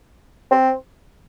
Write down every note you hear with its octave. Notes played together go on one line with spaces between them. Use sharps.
C4